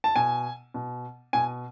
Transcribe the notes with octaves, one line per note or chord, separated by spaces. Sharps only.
A5
B2 G#5
B2
B2 G#5